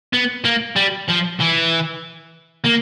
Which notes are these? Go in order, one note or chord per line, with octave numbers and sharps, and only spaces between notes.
B3
A#3
G3
F3
E3
A#3